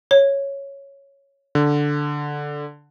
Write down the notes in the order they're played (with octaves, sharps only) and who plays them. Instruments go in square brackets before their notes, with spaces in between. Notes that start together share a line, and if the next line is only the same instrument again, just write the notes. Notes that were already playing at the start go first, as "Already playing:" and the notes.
[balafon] C#5
[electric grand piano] D3